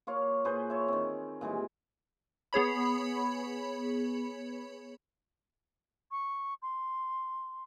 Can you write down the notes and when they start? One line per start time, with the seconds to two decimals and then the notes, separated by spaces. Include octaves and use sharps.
0.07 A#3 F4 C#5 F5
0.44 A#2 G#4 B4 C5
0.70 C#5 E5
0.88 D#3 C4
1.41 A#2 E3 G3 G#3
2.53 B3 G#4 C#5 B5
6.11 C#6
6.62 C6